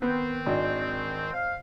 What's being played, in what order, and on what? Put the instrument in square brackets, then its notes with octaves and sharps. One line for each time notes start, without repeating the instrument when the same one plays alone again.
[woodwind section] D#3 C4 [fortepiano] B3
[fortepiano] G#1 D4
[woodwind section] C5 F5